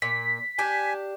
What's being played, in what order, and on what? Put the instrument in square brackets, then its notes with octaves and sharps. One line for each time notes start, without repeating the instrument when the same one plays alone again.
[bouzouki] A#2 [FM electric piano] B6
[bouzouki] D4 G4 [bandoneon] G#5